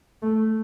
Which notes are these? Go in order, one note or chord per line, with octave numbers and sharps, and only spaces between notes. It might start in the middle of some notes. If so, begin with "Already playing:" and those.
A3